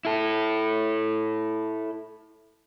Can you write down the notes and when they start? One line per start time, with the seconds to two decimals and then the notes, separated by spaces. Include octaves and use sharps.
0.05 E4 A4